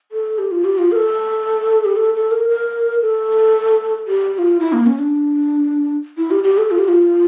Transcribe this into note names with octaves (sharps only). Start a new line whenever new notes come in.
A4
G4
F4
G4
F4
A#4
A4
G4
A4
A4
A#4
A#4
A4
G4
G4
F4
E4
A#3
C#4
D4
E4
G4
G4
A4
F4
G4
F4